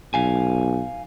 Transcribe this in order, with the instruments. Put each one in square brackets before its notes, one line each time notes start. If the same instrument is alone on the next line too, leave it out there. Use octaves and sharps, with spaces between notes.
[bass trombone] B1 [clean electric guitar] F5 G#5